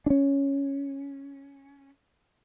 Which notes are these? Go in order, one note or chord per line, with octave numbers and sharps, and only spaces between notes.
C#4 D4